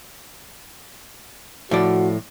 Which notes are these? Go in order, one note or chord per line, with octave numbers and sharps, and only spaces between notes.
A2 F3 F#4 D5